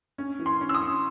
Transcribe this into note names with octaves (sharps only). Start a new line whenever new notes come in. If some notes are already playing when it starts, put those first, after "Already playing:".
C#4
E3
C6
C#4
E6
D#6
C#4